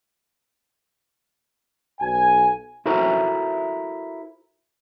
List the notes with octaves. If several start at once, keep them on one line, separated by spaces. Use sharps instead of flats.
B1 G#5
E4 F#4 A4 A#4 C5 E5